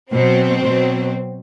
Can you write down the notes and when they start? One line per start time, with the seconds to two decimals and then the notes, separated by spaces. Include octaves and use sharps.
0.12 B2 F#3 C4
0.64 B2 F#3